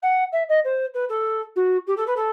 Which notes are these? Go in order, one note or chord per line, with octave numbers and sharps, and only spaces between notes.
F#5
E5
D#5
C5
B4
A4
F#4
G4
A4
B4
A4